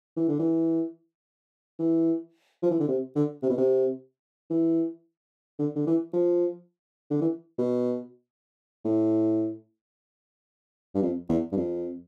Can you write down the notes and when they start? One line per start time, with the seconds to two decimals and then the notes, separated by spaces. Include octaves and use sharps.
0.17 E3
0.28 D3
0.39 E3
1.79 E3
2.63 F3
2.71 E3
2.80 D3
2.88 C3
3.15 D3
3.42 C3
3.50 B2
3.57 C3
4.50 E3
5.59 D3
5.76 D3
5.87 E3
6.13 F3
7.11 D3
7.21 E3
7.58 B2
8.85 A2
10.95 G2
11.02 F2
11.29 E2
11.52 G2
11.57 F2